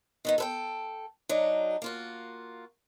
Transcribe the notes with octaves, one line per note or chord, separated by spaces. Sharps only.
D#3 B3 D#4
A4 B4 G5
F#3 D4 D#4
A#3 F4 F#4